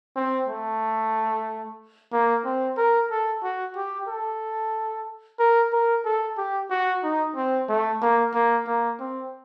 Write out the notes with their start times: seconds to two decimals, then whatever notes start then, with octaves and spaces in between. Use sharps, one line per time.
0.16 C4
0.48 A3
2.12 A#3
2.45 C4
2.77 A#4
3.11 A4
3.43 F#4
3.76 G4
4.08 A4
5.39 A#4
5.72 A#4
6.05 A4
6.38 G4
6.70 F#4
7.04 D#4
7.36 C4
7.69 A3
8.02 A#3
8.34 A#3
8.67 A#3
9.00 C4